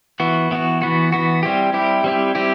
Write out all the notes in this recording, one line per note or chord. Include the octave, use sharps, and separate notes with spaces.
E3 B3 F#4
E3 B3 F#4
E3 B3 F#4
E3 B3 F#4
G3 C4 E4 G4
G3 C4 E4 G4
G3 C4 E4 G4
G3 C4 E4 G4